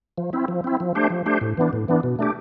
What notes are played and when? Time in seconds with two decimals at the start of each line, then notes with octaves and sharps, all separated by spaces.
0.18 F3
0.33 C4 E4
0.48 F3
0.64 C4 E4
0.80 F3
0.95 A3 D4 G4 C5
1.10 F3
1.26 A3 D4 G4 C5
1.41 A2
1.57 E3 B3 D4
1.73 A2
1.88 E3 B3 D4
2.03 B2
2.19 A3 D4 G4